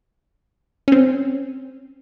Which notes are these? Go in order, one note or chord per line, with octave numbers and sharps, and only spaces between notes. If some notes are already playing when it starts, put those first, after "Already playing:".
C4 C#4